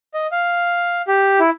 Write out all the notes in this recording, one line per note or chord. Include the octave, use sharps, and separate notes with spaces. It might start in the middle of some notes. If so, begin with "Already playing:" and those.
D#5
F5
G4
E4